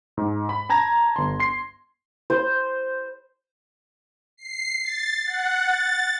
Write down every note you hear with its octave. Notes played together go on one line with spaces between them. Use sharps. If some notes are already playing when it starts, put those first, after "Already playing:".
G#2
B5
A5 A#5 G#6 A#6
G1 C6
C6 C7
C5
C7
A6
F#5
A6